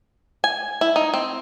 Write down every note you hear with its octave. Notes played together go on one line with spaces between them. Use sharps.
G#5
E4
D#4
C4